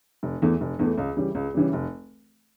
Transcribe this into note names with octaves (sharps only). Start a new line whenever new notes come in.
F1
E2 E3 A3
F1
E2 E3 A3
C#2
C#3 E3 G3
C#2
C#3 E3 G3
F1